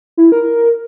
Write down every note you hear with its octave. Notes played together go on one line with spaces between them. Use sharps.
E4
A#4